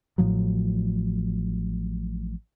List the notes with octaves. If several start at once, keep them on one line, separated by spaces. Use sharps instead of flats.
A1 A2 F3 F#3